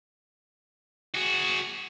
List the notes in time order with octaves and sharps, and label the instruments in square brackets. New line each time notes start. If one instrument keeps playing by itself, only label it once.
[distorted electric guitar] F#4 G#4